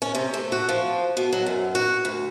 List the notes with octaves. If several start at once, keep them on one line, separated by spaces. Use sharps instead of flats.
C#4
C3
A3
F#4
F3
B2
F#3
F#2
F#4
D2